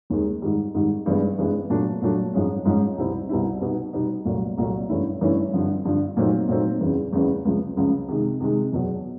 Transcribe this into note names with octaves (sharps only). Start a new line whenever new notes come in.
D#2 D#3 G#3
G#2 D#3 G3
G#2 D#3 G3
G2 E3 G#3 B3
G2 E3 G#3 B3
A#2 F#3 A3 D4
A#2 F#3 A3 D4
G#2 F3 G#3 C#4
G#2 F3 G#3 C#4
C2 B2 G3 C4 E4
C2 B2 G3 C4 E4
B2 G3 B3 D#4
B2 G3 B3 D#4
C2 A#2 F#3 A3
C2 A#2 F#3 A3
G2 E3 A3 C#4 E4
G2 E3 A3 C#4 E4
G2 D3 F3
G2 D3 F3
A#2 F#3 A3 C4 D#4
A#2 F#3 A3 C4 D#4
E2 C#3 E3
E2 C#3 E3
C#2 C#3 F3
C#2 C#3 F3
C3 D#3 G#3
C3 D#3 G#3
E2 B2 F#3